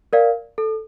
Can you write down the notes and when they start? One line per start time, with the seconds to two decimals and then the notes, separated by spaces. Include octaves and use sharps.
0.13 A#4 D5 F5
0.58 A4